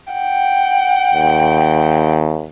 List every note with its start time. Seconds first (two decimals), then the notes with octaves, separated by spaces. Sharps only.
0.13 F#5 G5
1.14 D#2